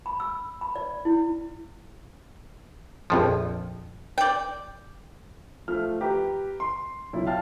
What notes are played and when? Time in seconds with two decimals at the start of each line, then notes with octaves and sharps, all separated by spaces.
0.06 B5
0.20 E6
0.61 B5
0.76 D5
1.05 E4
3.10 A#1 F2 F3
4.18 D5 G5
5.68 F3 A3 F6
6.01 G4 B4 A#5
6.60 C6
7.13 B1 E4 F4 D5
7.27 F5 G5 A5 F6